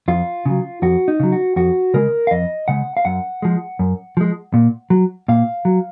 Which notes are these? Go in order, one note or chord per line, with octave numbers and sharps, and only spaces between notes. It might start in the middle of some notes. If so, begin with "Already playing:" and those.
F2 F4
C#3 F#3
F2 F#4
D#4
C#3 F#3
F#4
F2 F#4
C#3 G#3 A#4
F5
F2 D#5
C#3 G#3 F#5
F5
F#2 F#5
F3 G#3
F#2
F3 G#3
A#2
F#3
A#2 F5
F#3